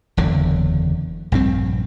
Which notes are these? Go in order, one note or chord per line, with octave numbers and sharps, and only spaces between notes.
F#1 E2 D3
A#1 G2 C4